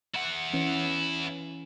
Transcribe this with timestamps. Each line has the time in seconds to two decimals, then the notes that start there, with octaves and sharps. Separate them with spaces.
0.14 E4 F#5
0.54 E3 C#4